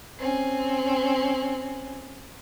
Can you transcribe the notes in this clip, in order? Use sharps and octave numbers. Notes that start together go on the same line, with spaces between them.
C4 C#4